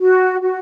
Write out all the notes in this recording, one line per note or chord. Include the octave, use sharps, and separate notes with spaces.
F#4
F#4